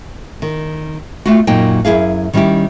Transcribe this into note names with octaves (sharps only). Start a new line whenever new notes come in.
D#3
A3 F4 F#4
F#2 A#2 F#3 D#4 G5
F#2 E4 G#4 F5
D#3 G3 C#4 E4 G4